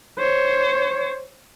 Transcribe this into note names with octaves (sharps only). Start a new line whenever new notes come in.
C5 C#5